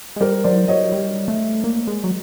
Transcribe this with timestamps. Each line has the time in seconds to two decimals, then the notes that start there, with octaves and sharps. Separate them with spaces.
0.16 G#3
0.21 G3 A#4 C5
0.44 F#3 C5 D5
0.68 F#3 C#5 D#5
0.92 G3
1.28 A3
1.64 A#3
1.87 G#3
2.04 F#3